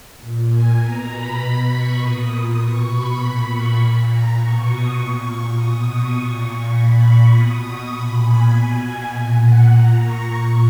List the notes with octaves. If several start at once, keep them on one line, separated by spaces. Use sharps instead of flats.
A#2
G#5
B2 A#5
B5
B2
C#6
A#2 D#6
B2 C#6
B5
A#2
C#6
A#2
A#5
B2 C#6
D#6
A#2 C#6
B2 D#6
C#6
A#2
C#6
A#2 B5
C#6
B2 D#6
C#6
A#2 B5
G#5
B2 G#5
A#2
F#5
A#2 A#5
C#6
A#2 C#6